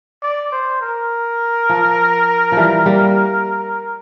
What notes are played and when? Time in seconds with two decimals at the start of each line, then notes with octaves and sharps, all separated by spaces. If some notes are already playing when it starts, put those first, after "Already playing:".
0.23 D5
0.52 C5
0.81 A#4
1.69 F3
2.52 E3 F3 G3
2.86 G3 A#3